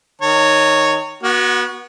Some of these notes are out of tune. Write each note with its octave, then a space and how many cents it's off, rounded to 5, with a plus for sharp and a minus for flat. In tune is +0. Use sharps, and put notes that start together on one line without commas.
D#3 +0 C#5 +0 A#5 -35
B3 -35 F#4 +0